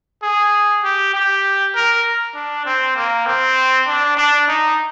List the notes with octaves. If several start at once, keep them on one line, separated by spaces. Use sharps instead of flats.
G#4
G4
G4
A#4
D4
C4
A#3
C4
D4
D4
D#4